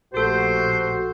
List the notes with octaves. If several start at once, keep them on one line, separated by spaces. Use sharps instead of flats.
A#1 A3 F#4 G4 A4 C5